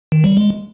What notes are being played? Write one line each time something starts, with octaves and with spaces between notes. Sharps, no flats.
D#3
G3
G#3